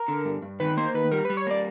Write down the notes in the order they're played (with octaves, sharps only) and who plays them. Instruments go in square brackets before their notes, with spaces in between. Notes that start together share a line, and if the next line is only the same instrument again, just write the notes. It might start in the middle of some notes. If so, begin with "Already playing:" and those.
Already playing: [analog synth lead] A#4
[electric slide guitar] D3
G2
G2
[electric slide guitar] D#3 [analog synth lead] B4
[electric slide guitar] A#3 [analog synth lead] C5
[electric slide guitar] D#3 [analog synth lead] B4
[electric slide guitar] G3 [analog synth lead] A#4
[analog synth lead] B4
[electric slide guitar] G3
[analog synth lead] C#5
[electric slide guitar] A#3 [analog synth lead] D5